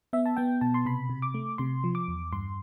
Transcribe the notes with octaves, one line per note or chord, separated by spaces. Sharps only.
B3 E5
A5
B3 G5
B2 A5
C6
C3 B5
C3
D6
A3
C3 C6
F3
D6
E2
G2 C6